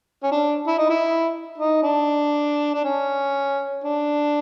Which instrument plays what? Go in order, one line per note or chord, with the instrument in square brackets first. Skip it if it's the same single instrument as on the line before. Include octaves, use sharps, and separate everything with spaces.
[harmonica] C#4
D4
E4
D#4
E4
D#4
D4
D4
C#4
D4